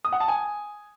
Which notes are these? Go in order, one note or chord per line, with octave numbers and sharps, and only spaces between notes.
D#6
F#5
A5
G#5